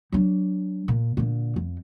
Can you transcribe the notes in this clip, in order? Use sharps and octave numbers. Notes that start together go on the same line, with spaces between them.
F#3 D4
A#2
A#2 D3
F2